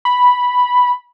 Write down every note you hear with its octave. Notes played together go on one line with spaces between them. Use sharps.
B5